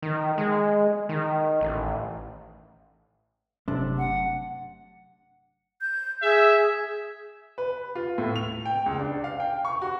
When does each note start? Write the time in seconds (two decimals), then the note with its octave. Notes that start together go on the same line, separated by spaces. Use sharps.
0.02 D#3
0.38 G#3
1.09 D#3
1.61 A1
3.68 G1 C3 F#3 A3 D4
3.98 F#5
5.81 G6
6.22 G#4 E5
7.58 B4
7.95 F4
8.18 A2
8.36 F7
8.65 G5
8.86 C#2
8.99 D4
9.24 F5
9.40 G5
9.65 C#6
9.82 F#4